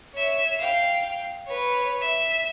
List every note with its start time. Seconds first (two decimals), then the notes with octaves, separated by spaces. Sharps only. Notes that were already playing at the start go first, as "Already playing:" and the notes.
0.14 C#5 E5
0.59 F5 G5
1.48 B4 C#5
2.02 E5